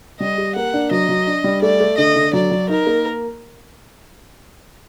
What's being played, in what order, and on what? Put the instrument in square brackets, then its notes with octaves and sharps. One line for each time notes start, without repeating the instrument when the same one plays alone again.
[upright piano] G3 [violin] D#5
[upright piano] G4
[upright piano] A#3 [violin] F#5
[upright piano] D4
[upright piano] F#3 [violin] D#5
[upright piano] F#3
D4
G3
[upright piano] A3 [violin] D5
[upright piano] A3
[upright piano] D3 [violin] D#5
[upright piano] D3
[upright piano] F#3 [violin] D5
[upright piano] F#3
[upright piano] D#4 [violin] A#4
[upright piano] A#3